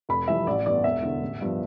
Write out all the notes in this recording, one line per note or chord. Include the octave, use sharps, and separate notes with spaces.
F1 B5
F2 E3 G3 E5
A1 D5
G2 E3 B3 D5
E1 E5
E2 D3
A1
G2 F3 B3